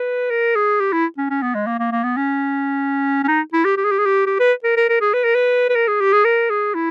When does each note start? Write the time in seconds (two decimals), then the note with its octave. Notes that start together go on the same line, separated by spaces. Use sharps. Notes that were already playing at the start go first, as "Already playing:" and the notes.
Already playing: B4
0.30 A#4
0.55 G#4
0.80 G4
0.92 E4
1.17 C#4
1.30 C#4
1.42 B3
1.55 G#3
1.67 A#3
1.79 A#3
1.91 A#3
2.04 B3
2.17 C#4
3.23 C#4
3.28 D#4
3.53 E4
3.65 G4
3.77 G4
3.84 G#4
3.91 G4
3.99 G#4
4.05 G4
4.27 G4
4.40 B4
4.64 A#4
4.77 A#4
4.89 A#4
5.01 G#4
5.13 B4
5.24 A#4
5.35 B4
5.69 B4
5.76 A#4
5.88 G#4
6.01 G4
6.13 G#4
6.25 A#4
6.50 G#4
6.75 E4